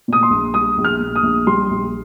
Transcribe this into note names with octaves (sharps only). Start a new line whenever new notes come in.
A#2 D#6
C6
A#1
G3 D#6
A#1
F6
A#2
D#6
A#1
G3 C6
A#1